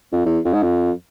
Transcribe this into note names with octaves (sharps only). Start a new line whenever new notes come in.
F2
E2
F2
G#2
F2